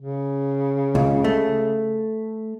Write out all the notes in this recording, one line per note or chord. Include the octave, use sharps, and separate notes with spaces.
C#3
C#2
A3